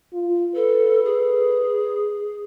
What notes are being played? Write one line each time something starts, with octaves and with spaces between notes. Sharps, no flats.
F4
A4 B4
G#4